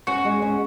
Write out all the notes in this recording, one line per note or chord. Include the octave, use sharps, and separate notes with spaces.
C#4 F#4
G#3
C#4